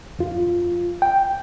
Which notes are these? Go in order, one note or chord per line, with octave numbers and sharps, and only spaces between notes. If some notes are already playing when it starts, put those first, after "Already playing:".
F2 F4
G5